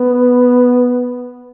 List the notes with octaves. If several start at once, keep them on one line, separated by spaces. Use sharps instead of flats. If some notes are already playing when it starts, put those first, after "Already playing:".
Already playing: B3